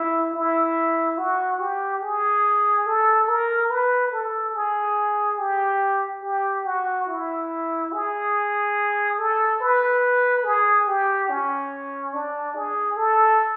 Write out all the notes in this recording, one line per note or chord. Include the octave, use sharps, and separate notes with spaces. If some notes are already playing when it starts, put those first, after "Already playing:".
Already playing: E4
E4
F#4
G4
G#4
A4
A#4
B4
A4
G#4
G4
G4
F#4
E4
G#4
A4
B4
G#4
G4
C#4
D4
G#4
A4